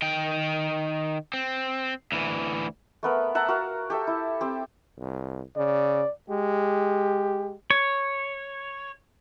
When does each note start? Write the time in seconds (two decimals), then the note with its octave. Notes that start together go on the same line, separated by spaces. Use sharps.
0.02 D#3 G5
1.34 C4
2.12 D2 E3
3.03 A3 B3 A#4
3.35 E5 F#5 A5 A#5
3.48 F#4 A#4 F5
3.90 G4 A4 E5
4.07 E4
4.41 C4 G4
4.99 C2
5.56 C#3 D5
6.30 G#3 G4
7.70 C#5